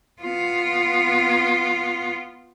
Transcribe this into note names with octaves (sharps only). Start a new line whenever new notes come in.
B3 F4